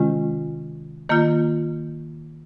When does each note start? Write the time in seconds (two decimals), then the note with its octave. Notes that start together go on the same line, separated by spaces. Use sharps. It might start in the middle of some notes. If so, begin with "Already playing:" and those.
Already playing: C3 D#3 G#3 C#4 F4
1.09 D#3 A#3 F4